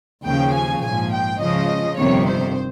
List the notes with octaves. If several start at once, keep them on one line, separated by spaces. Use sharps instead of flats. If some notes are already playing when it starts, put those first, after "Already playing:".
D#2 C#3 F3 G5
G#5
A#1 G#2 F3 G#5
G5
C#2 C#3 F3 D#5
G1 F2 C3 D#3 C#5
C5